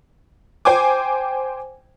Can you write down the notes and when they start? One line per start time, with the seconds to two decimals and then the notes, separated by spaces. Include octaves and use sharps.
0.65 C5 G5 G#5 D6